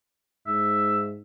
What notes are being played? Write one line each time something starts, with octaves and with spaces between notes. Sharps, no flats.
G#2 E5